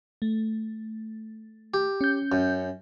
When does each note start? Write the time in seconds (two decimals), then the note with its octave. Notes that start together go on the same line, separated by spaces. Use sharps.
0.22 A3
1.74 G4
2.01 C#4 G6
2.32 F#2